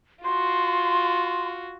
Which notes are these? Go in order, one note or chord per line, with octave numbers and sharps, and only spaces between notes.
F4 F#4 C6